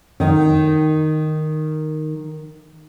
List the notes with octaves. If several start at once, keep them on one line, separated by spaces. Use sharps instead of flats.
D#3 D#4